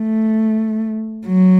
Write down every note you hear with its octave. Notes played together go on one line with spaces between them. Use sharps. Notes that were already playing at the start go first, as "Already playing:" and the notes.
Already playing: A3
F#3